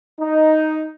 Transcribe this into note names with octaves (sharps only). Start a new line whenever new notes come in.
D#4